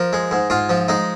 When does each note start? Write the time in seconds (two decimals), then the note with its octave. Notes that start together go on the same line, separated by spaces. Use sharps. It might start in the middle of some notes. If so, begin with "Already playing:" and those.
Already playing: F3 A#4
0.13 G#3
0.31 G#2
0.50 G#2 F4
0.69 F3
0.88 G#3 D#4